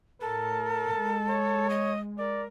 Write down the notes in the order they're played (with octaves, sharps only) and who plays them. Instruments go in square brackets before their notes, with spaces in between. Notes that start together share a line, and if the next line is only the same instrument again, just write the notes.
[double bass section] A2 [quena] A4 [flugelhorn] A#4
[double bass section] G#3
[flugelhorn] C#5
[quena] D#5
[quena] A#4 [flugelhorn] D5